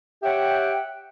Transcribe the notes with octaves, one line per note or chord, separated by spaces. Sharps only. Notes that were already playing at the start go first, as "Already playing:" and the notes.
G4 C#5 E5 F#5 G5